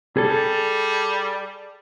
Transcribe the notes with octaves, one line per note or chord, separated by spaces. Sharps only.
G3 G#4 A4